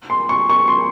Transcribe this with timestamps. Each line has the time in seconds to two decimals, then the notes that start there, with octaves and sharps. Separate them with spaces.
0.10 C6
0.29 C#6
0.50 C#6
0.68 C6